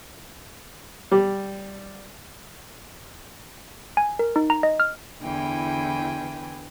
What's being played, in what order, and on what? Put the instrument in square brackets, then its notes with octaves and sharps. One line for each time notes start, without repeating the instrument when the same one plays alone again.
[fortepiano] G3
[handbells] G#5
A#4
D#4
A#5
D#5
F6
[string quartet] E2 D3 E3 E4 G5 G#5